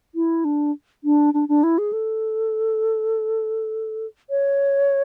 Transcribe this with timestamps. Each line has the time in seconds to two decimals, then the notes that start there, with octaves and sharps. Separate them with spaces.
0.15 E4
0.45 D4
1.04 D4
1.34 D4
1.48 D4
1.63 E4
1.78 G#4
1.93 A4
4.30 C#5